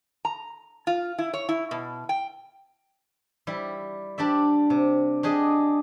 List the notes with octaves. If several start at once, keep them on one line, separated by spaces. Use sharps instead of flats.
A#5
F4
E4
C#5
E4
B2
G5
G3 E4
D4 G4 D5 E5
C3
D4 G4 G#4 D#5